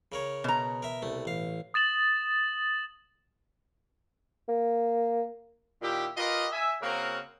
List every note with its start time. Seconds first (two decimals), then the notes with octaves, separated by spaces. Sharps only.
0.12 C#3 A#4 C#5
0.44 B2 A#5
0.83 A#4 E5
1.02 C2 A3
1.25 A1 F5
1.74 D#6 A6 E7 F#7
4.49 A#3
5.82 A#2 D#3 E4 G4
6.17 F4 G4 A#4 B4 D#5
6.52 E5 G#5
6.82 C#3 A#3 C4 F#4 A#4